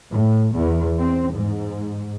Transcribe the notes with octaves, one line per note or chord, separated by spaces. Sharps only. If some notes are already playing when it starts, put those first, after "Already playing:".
A2
E2
C4
G#2